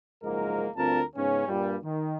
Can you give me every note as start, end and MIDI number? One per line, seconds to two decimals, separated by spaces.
0.23 0.68 30
0.23 0.68 44
0.23 0.68 53
0.23 0.68 56
0.23 0.68 58
0.23 0.68 70
0.76 1.01 38
0.76 1.01 43
0.76 1.01 60
0.76 1.01 65
0.76 1.01 70
0.76 1.01 81
1.16 1.45 44
1.16 1.45 49
1.16 1.45 59
1.16 1.45 61
1.48 1.76 43
1.48 1.76 46
1.48 1.76 55
1.83 2.17 51